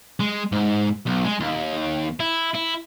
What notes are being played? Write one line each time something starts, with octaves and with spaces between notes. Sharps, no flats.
G#3
G#2
B1
G#3
D#2
E4
E4